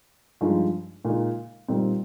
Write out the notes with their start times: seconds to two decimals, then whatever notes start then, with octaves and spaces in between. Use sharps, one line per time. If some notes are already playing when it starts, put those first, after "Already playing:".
0.41 G2 F3 G#3 D#4
1.05 A#2 G#3 D#4
1.68 A#2 G3 C4 D#4